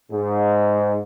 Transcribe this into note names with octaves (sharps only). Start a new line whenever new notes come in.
G#2